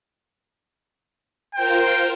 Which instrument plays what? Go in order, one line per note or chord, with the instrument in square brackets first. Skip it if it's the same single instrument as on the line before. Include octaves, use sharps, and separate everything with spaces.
[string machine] F4 A#4 C5 [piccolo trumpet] G5